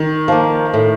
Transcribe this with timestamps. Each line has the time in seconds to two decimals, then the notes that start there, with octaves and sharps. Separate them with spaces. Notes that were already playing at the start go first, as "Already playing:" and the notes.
Already playing: D#3
0.28 F3 A#3
0.74 A2